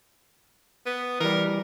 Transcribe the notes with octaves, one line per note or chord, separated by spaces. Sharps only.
B3
E3 G3 A#4